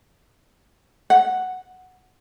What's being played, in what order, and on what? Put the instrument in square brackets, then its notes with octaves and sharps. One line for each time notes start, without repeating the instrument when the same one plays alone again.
[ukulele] F#5